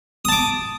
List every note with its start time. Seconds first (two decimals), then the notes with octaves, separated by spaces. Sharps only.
0.25 D#6
0.28 A5
0.32 D6